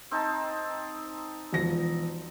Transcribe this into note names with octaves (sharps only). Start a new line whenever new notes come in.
C4 D#4 A5
E1 F3 A#6